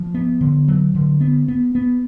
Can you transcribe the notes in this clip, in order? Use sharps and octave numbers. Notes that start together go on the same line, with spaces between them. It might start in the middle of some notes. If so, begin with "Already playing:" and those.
Already playing: F3
B3
D3
F#3
D3
B3
B3
B3